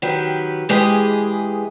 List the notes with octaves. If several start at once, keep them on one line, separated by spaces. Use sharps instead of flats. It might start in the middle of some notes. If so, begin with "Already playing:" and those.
D#3 F#3 G4 B4
E3 G#3 G4 G#4 B4 D#5